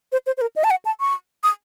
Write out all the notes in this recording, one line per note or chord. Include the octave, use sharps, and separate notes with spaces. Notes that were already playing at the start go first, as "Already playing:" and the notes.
C5
C5
C5
A#4
D#5
A5
F#5
A5
C#6
D#6